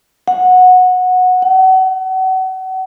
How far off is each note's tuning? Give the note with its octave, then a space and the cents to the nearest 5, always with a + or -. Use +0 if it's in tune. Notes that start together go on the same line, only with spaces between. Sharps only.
F#5 -15
F#5 +30